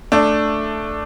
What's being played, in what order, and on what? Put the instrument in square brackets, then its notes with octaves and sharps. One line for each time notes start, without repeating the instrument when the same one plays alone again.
[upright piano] A3 D4